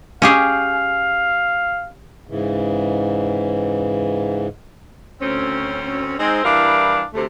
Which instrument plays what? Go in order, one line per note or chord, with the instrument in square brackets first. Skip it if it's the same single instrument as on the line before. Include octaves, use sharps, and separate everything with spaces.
[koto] C#4 G4 G#4 [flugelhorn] F5
[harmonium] G#2 C#3 E3
[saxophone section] D2 C4 C#4
G#3 C4 D#4
E3 G3 D4 E4 A#4 F5
D2 C3 A3